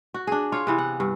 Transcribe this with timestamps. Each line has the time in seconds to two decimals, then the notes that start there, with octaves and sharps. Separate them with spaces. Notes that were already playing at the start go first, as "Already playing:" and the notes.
0.14 F#4
0.27 D4 G#4
0.52 F4 C#5
0.67 C3 E3 B3
0.78 F#5
1.00 G2